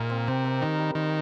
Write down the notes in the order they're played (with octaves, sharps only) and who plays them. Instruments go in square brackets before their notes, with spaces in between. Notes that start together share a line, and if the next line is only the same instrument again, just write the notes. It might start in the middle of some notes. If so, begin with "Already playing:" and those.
Already playing: [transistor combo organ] A#2 [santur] A#3 D#4 G#4 A#4
[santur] C4
[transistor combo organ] C3 [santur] C4
[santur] C4
[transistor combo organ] D#3 [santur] G4
[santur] G3
[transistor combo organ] D#3 [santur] C5